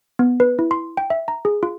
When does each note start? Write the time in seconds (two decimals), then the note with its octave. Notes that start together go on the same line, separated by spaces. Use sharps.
0.19 B3
0.40 B4
0.59 E4
0.71 C6
0.97 G5
1.10 E5
1.28 A#5
1.45 G#4
1.63 F4